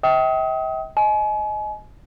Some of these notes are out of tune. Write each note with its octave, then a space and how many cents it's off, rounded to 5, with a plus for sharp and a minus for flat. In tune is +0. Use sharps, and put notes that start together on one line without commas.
E5 -45 G5 -20 D#6 +35
D#5 +0 G#5 +35